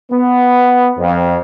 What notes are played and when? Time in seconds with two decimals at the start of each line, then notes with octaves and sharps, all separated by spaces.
0.11 B3
0.98 F2